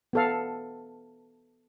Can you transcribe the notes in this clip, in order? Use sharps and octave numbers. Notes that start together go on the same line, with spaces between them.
B3 A4 F5